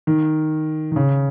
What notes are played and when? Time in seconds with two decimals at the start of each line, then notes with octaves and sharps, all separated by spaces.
0.07 D#3
0.92 D#3
0.96 C#3